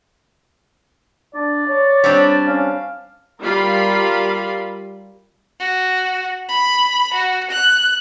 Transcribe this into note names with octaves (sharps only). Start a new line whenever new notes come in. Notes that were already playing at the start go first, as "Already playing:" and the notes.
D4 D5
C#5
G3 C4 D4
C#4 F5
G3 F4 A#4 F5 B5
F#4
B5
F#4
F#6